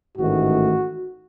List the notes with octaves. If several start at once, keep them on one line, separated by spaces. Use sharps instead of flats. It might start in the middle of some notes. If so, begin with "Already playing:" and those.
A1 G#2 D#3 A3 F#4